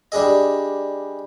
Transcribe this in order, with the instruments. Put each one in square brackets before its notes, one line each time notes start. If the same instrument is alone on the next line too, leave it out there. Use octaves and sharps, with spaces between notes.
[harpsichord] G3 D4 G#4 D#5